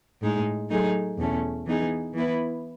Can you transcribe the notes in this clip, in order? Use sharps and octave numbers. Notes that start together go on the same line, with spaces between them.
A2 G#3 D#4 G#4
F#3 A3 D#4 G#4
E2 B2 A3 C#4
E3 B3 D#4 G#4
E3 B3 E4 B4